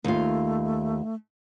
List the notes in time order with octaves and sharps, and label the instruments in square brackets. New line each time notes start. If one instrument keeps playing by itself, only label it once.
[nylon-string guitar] D#2 F4 [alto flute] A3